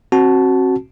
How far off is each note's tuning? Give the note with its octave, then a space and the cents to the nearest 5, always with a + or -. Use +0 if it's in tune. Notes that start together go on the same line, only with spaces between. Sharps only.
C4 +35 F#4 +5 A5 -10